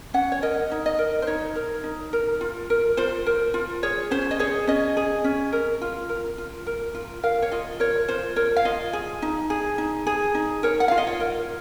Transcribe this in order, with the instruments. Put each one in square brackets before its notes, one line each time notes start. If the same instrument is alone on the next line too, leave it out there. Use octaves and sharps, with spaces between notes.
[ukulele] C#4 F#5
C#5
A#4 D#5
D#4
D#5
A#4
C5
D#4 C#5
A#4
D#4
A#4
F4
A#4
F4 C5
A#4
F4
G#4 C#5
C#4 C5
D#5
G#4 C#5
C#4 D#5
G#4
C#4
A#4
F4
A#4
F4
A#4
F4
A#4 F5
C#5
F4 D#5
A#4 C#5
F4 C5
A#4 C#5
F5
F4 D#5
G#4
D#4
G#4
D#4
G#4
D#4
A#4 C#5
F#5
F4 F5
D#5
C#5
A#4